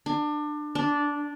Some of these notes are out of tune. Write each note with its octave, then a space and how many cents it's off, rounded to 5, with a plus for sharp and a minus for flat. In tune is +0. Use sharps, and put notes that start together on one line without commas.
D4 +25
D4 -10